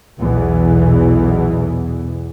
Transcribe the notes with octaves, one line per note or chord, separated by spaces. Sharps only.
B1 E2 B2 E3